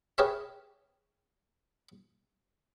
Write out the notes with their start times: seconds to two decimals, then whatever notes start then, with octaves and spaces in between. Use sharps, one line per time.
0.18 G4 G#4 A#4 B4 C#5 E5